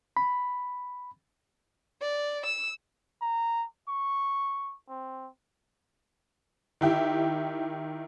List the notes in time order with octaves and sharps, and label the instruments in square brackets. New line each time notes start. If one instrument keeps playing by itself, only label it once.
[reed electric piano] B5
[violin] D5
E6
[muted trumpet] A#5
C#6
C4
[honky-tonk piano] D#3 E4 G4